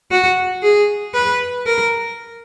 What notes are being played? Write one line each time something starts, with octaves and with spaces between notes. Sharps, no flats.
F#4
G#4
B4
A#4